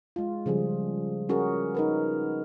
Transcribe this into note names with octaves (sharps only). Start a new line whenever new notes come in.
G#3 F4
C#3 F3 G3 G#4
C#4 F#4 G#4 A#4
D#4 A#4 B4